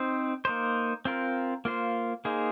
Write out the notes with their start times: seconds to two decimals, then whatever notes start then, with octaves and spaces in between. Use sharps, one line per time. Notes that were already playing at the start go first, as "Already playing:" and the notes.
Already playing: C4 D#4 C5
0.45 A#3 D#4 C5
1.05 C4 F4 A#4
1.65 A#3 F4 C5
2.25 A#3 D#4 G#4 C5